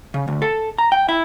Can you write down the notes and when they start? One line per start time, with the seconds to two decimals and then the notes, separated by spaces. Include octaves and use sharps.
0.14 C#3
0.28 D2
0.42 A4
0.78 A#5
0.92 G5
1.09 E4